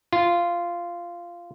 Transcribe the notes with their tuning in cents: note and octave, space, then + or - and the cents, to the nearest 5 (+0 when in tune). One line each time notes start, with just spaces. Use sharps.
F4 -10